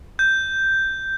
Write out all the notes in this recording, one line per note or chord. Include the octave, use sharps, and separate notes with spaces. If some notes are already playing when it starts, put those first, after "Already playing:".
G6